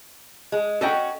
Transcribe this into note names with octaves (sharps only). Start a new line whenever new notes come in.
G#3
C#4 D#4 F#4 A4 D#5 G5